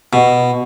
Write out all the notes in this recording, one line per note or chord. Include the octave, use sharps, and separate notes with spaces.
B2